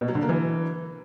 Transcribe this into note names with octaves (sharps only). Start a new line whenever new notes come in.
B2
F#3
D3
A#3
E3